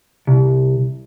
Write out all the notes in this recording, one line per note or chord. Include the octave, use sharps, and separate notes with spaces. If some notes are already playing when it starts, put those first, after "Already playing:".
C2